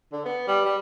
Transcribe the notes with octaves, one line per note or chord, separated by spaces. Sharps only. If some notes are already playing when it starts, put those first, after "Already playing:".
D3
B3
G3
G3